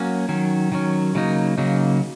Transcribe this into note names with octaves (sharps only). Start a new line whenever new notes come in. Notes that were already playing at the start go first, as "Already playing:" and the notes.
Already playing: F#3 A#3 C#4
D#3 F#3 C#4
D#3 F#3 C#4
C#3 F#3 A#3 D#4
C#3 F#3 A#3 D#4